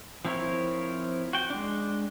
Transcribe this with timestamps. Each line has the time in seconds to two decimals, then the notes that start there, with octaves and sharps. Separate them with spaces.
0.25 F3 C4 E4 A#4 C#5
1.33 F#4 G5
1.50 G#3 D4